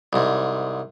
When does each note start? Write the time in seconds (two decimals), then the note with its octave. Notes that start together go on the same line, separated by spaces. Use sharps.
0.13 C2 G#2